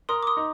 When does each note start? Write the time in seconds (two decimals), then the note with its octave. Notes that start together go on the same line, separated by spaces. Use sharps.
0.09 A#4 C6 D#6
0.23 D6
0.27 C6 D#6
0.37 D#4